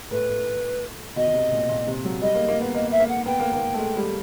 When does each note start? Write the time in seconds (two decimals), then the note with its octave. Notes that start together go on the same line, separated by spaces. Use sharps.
0.11 A2 B4
0.29 A2
1.16 B2 D#5
1.27 B2
1.34 C3
1.52 A#2
1.69 A#2
1.87 C3
2.05 F#3
2.21 G3 D#5
2.35 A#3
2.48 A#3
2.60 B3
2.74 A#3 D#5
2.91 E5
3.00 A#3
3.09 F#5
3.26 B3 G5
3.40 A#3
3.53 A#3
3.74 A3
3.78 G#3
3.97 G3